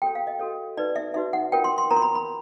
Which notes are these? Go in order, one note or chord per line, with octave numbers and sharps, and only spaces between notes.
F#4 A4 C#5 G5
F5
D#5
F#4 A4 C#5
D#4 F#4 B4 D5
E5
D#4 F#4 B4 E5
F#5
F4 A#4 C#5 G5
C6
C6
F4 A#4 C#5 A#5
C6
B5
B5